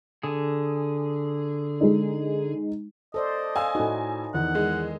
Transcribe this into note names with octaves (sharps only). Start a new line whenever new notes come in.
D3 G#4
G#3 D#4
A4 C5 D5 D#5
F5 G#5 E6
A2 D#4 F#4
E2 D#3 F#5
G#3